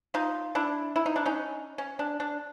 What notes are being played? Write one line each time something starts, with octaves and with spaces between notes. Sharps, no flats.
D#4 F4
D4 E4
E4
D#4
D4
C#4 D#4
C#4
D4
D4